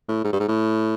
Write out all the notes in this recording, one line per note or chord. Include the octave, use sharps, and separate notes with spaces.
A2
G#2
G2
G#2
A2